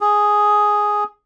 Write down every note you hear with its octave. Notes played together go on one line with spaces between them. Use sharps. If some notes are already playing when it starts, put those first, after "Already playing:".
G#4